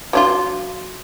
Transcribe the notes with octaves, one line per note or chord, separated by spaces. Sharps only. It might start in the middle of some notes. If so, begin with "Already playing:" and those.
F#3 D4 F4